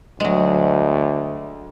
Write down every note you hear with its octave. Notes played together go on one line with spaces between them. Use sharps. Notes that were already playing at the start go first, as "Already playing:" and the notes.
D2 F#3 G#3